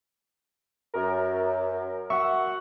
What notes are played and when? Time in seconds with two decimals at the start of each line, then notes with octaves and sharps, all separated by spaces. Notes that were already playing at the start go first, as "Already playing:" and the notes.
0.94 F#2 A#4
2.10 F#4 E5 F#5 C#6